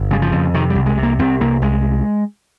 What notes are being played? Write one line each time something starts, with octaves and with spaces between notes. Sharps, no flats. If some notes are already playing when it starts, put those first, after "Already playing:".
Already playing: G1
C#3 G3
F3
F2
C3 D#3
G3
C2
G#3
C3
A#3
C2 C4
C2 A#3
C2 G#3